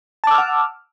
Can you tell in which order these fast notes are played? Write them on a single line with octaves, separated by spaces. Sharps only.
A5 D6 E6 F6 F#5